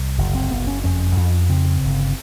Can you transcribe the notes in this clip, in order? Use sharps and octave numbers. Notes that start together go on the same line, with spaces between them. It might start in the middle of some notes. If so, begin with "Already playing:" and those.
Already playing: C2
F#1
C4
F#1 B3
C#4
F2 C#4
F2
C#3 C4
G1